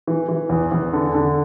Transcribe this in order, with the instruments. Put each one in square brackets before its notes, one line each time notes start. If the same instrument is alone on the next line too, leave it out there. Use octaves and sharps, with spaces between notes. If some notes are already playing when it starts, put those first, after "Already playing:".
[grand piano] E3
E3
E2
E2
D3
D3